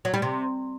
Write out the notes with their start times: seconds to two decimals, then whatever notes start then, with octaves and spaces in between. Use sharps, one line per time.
0.05 F#3
0.14 G3
0.22 C3